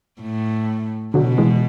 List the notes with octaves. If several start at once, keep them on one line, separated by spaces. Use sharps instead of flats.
A2
B2 D3 F#3
E3 G#3